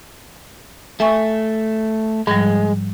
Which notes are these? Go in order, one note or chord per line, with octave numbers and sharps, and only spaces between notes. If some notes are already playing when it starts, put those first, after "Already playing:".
A3 E5 G#5 C#6
G#2 F3 G3 G#3